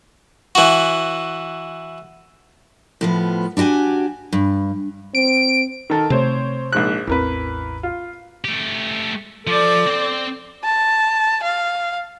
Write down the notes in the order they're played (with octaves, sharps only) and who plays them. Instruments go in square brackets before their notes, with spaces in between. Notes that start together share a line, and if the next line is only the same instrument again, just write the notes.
[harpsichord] E3 F#4
[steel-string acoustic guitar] A2 F3 B3
D4 E4 F#4 G4 G#5
G2
[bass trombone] C4 [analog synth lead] D7
[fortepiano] D#3 A4 A#4
[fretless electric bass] C3 A3 [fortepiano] C4 C5 C#5
[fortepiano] A#1 G#2 F#6
[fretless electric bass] A1 E2 C4 [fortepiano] E3 A#4 B4
[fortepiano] F4
[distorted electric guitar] A3 G4
[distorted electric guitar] F3 [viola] A4 D5
[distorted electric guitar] C4 C5
[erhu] A5
F5